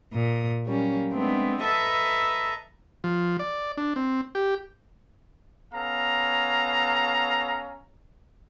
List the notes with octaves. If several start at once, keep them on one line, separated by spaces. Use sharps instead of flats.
A#2 D#6
F#3 G3 A#3 C#4
G#3 A3 B3 C4 D4
A4 B4 D#5 E5 A5 A#5
F3
D5
D4
C4
G4
B3 C#4 A4 F5 A#5